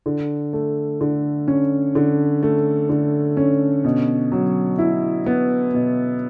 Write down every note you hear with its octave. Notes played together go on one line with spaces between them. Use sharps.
D3
A3
D3
C#4
D3
A3
D3
C#4
B2
F#3
E4
B3
B2